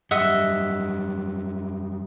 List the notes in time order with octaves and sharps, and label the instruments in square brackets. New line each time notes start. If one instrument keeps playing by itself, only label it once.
[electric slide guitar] F#2 G3 [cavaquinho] D#5 E5 F#5